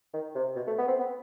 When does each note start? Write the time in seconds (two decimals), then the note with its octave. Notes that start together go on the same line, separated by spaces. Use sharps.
0.14 D#3
0.36 C3
0.56 B2
0.67 A3
0.79 B3
0.88 C4
0.99 B3